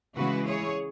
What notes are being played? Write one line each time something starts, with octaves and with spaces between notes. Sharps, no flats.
C#3 E3 G#3 E4 F#4 B4
G#4 C#5